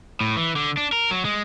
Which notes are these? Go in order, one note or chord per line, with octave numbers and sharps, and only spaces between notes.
A2
E3
D3
D4
A#4
F#3
G#3